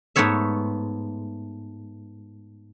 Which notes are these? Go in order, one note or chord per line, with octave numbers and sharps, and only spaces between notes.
G#2 A3 B3 C#5 E5